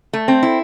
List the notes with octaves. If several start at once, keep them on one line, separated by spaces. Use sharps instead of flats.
A3
C4
E4